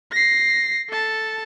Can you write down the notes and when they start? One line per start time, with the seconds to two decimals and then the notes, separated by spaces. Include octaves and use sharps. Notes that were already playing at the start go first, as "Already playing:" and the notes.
0.12 A#6 C7
0.89 A4 A5